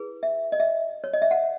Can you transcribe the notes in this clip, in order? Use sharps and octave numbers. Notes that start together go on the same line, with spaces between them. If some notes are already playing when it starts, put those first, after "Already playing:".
Already playing: E4 G#4 B4
E5
D#5
E5
C#5
D#5
E5
F#5